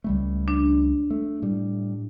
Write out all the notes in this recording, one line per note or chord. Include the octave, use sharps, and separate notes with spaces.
C#2 G3 A3
D4
A3
A2 G3